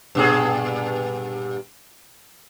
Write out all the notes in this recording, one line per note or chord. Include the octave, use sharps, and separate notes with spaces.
G2 A#2 G#4